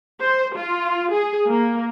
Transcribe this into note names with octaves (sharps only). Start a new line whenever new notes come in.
C5
F4
G#4
A#3